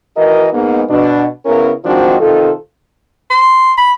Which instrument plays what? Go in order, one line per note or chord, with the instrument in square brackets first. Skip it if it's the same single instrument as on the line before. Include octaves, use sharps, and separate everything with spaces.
[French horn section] E3 F#4 A#4 D#5
G#2 A#3 B3
B2 D4
C#3 B3 C#4 E4 A#4
G#2 D#3 F3 C4 D4 F#4
C3 D#3 F4 A4
[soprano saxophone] C6
B5